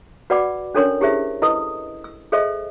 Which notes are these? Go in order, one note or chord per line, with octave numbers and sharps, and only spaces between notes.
F#4 B4 D5 F#5 B5 D6
C#4 D4 A4 A#4 C#5 C6
E4 G4 G#4 A#4 C5 E5
E4 A4 B4 D#5 D#6
E6
G#4 A4 C5 D#5 E5 C6